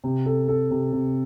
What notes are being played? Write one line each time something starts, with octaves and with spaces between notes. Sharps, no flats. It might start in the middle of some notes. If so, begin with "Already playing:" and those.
C3
A4
A4
C3
C3